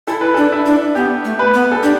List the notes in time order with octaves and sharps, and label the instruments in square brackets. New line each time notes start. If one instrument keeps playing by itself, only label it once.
[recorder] E4 [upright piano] A4
[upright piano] B4
[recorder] D4 [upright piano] A4
[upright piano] E4
[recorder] D4
[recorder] B3 [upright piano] G4
[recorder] A3
[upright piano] B4
[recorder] B3
[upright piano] A4
[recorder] D4 [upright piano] G4